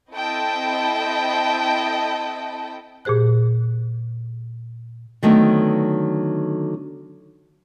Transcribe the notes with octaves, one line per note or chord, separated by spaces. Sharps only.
C4 E4 A4 D#5 G5 A5
A#2 G4 G#4 C5 F#6
D3 D#3 F#3 A3 B3 C4